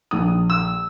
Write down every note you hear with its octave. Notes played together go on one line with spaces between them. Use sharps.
A#1 D#6
E6